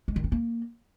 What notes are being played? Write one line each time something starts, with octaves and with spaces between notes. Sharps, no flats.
G#3
D#3
C4
A#3